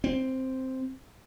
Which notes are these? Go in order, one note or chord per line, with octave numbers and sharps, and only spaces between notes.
C4